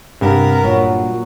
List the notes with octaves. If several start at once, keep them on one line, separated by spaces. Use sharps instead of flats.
G2 C3 B3 A#4
A#2 F#3